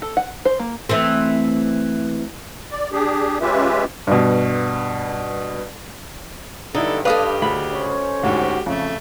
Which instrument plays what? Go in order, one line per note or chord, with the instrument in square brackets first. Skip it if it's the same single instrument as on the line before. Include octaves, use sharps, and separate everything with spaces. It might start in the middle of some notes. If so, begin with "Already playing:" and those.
[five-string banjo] A4
F#5
C5
A#3
[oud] E3 A3 C4
[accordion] D5
D4 G4 G#4
G#3 C#4 F4 G4 B4 E5
[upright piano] G2 B2
[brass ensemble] G2 [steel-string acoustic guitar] D3 [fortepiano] D#4 E4 [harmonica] A4
[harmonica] G4 [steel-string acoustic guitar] A4 D#5 F5 [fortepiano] B4 D#6
[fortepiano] D2 G#4 B5
[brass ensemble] C#4 C5 C#5
[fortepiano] D2 G#2 [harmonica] F#4 G4
[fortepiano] F2 C#3 [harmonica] A3